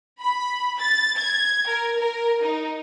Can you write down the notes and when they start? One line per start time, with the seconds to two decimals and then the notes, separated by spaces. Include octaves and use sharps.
0.21 B5
0.80 A6
1.18 G#6
1.67 A#4
2.00 A#4
2.42 D#4